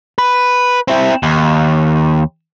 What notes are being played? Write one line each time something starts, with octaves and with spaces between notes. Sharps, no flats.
B4
C4 E4
D#2